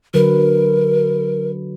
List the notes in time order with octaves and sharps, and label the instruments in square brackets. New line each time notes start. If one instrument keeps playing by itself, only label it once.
[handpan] D3 F#3 B4 [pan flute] A#4